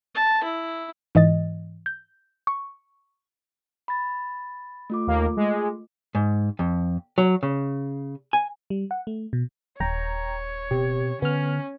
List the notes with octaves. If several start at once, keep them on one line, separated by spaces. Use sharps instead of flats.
A5
E4
G#2 E3 D#5 A6
G6
C#6
B5 A6
A3 F4 D6
D#2 A#3
G#3
G#2
F2
F#3
C#3
G#5
G3
F#5
A3
B2
D#1 C#5 G5 A#5
B2 C4 G4
D3 B3 C#4 F6